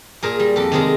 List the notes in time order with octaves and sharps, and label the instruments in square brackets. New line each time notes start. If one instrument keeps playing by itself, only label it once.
[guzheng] A#2 G#4 A#4
G3
F2 G4 A4
C3 D#3 G#3 G#4 A#4